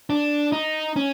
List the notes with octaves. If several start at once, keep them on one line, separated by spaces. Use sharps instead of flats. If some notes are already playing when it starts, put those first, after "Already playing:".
D4
D#4
C#4